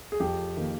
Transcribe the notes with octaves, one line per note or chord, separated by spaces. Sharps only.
G#4
F2 G4
D#3 A#3